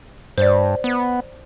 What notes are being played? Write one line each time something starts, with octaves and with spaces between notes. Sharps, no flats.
G2 C5 D5
B3